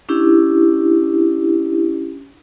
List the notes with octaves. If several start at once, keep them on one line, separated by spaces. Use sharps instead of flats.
C#4 D4 E4 G4